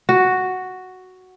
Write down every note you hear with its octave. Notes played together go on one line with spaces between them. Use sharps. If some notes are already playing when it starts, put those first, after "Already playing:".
F#4